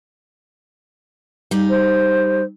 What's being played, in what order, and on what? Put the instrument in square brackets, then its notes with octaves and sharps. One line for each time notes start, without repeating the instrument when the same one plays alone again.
[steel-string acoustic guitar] G3 D#4
[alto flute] C5